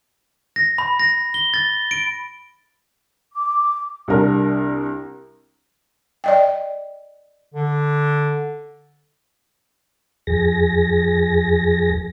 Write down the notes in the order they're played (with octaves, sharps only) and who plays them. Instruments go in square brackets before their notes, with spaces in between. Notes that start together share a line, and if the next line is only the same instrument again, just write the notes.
[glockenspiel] A#6
B5
A#6
G7
A6
D7
[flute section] D6
[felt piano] C2 D4 A#4
[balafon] D5 D#5 G5
[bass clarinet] D3
[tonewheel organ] F2 G#4 A#6